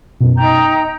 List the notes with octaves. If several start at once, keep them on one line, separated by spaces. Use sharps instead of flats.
F#2 B2
D#4 G5 A#5 G6